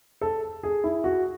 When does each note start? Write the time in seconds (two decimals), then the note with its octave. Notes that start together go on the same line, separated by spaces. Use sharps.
0.21 A4
0.63 G#4
0.84 E4
1.04 F#4